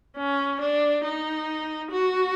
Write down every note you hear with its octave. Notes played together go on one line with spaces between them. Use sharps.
C#4
D4
D#4
F#4